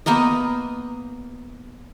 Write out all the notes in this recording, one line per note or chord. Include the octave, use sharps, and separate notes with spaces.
A#3 B3 A#4 D#5